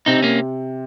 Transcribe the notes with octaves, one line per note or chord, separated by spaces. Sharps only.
C3 C4 D#4
A#3 C#4